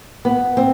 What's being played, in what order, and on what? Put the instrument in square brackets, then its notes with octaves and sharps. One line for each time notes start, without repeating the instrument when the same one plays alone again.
[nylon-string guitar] B3
C4